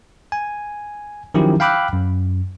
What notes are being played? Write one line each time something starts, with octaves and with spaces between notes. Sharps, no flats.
G#5
D#3 F3 F#3 C#4 E4 G4
F5 G5 B5 D6 E6 F#6
F#2